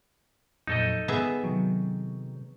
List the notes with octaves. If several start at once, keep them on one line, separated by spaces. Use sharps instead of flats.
F2 A#2 F#3 D#4 A4 D#5
B3 G#4 E5 B5
C3 D#3 F#3